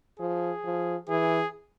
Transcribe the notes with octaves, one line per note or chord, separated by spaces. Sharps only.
F3 G#4
F3
E3 G#4